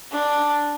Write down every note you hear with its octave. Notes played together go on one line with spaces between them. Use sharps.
D4